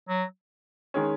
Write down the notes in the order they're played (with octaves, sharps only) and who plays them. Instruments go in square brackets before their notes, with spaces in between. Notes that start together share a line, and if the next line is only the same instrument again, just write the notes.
[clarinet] F#3
[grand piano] D#3 G#3 C#4